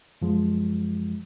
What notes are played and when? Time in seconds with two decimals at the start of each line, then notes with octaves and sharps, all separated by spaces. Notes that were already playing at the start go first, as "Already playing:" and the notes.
0.22 F#2 F3 G#3